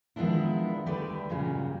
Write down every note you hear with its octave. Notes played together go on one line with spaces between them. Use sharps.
D#3 F3 G#3 B3 D4 E4
D2 D3 G3 A3 B4 D5
G2 A#2 C#3 F#3 G3